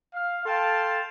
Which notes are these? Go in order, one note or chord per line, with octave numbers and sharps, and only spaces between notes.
F5
A4 F5 G5 A5 C6